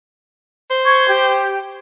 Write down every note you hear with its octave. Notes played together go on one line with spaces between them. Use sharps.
C5
C#6 G#6
G4